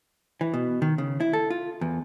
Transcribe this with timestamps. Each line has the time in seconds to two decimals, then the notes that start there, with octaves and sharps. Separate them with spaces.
0.41 E3
0.54 B2
0.82 D#3
0.98 C#3
1.20 E4
1.33 A4
1.50 F4
1.81 E2